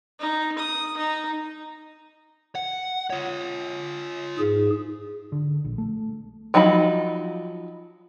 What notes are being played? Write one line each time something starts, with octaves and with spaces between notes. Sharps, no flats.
D#4
D#6
D#4
F#5
F4 C#5
G#2 G#4
D3
A#1
A3
F3 F#3 D#4 A#5 B5